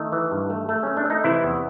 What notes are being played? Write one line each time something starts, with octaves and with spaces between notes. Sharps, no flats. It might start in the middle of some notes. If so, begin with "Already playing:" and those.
Already playing: D#3 A3 D#4
E3
G2
A3
A3
A3 C#4
D4
A3 D#4
C3 E3 E4
E2